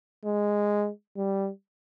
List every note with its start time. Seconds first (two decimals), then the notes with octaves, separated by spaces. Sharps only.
0.25 G#3
1.17 G3